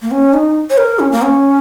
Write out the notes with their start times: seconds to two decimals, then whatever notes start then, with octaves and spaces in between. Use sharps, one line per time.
0.02 A#3
0.11 C#4
0.33 D#4
0.70 C#5
0.78 A#4
0.99 C#4
1.12 A#3
1.23 C#4